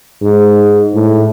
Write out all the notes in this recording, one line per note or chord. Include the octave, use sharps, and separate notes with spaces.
G#2
A2